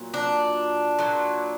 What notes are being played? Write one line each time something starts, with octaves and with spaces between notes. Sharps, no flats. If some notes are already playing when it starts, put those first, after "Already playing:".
Already playing: A#2 F#3
D4
A#2 F#3